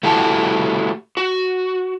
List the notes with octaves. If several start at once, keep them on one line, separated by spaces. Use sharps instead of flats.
A3 E4 F#4 G4 A5
F#4